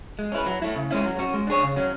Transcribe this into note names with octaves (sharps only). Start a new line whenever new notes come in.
G#3
C#4 E4 B4
F#3
A3 E4
C#3
G#3 C#4 E4
F#3
C#4 F#4
G#3
D4 G#4 C#5
C#3
F#3 C#4